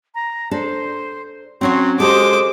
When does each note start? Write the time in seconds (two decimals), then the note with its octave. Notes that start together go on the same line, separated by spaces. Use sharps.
0.15 A#5
0.51 D4 A4 C5
1.61 F#3 C4 C#4 C#5 C6
2.00 G#3 F#4 G4 A4 C5 D6 D#6